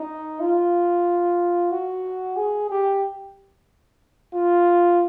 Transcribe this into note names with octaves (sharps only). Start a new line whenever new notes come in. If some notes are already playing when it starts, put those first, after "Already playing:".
Already playing: D#4
F4
F#4
G#4
G4
F4